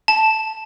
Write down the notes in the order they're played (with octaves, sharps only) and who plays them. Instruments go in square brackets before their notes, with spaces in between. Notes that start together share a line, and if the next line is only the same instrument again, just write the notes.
[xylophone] A5